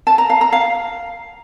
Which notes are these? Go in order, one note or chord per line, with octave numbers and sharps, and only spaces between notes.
A5
A#5
F5
A#5
F5